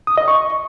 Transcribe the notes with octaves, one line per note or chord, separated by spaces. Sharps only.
D#6
D#5
C#6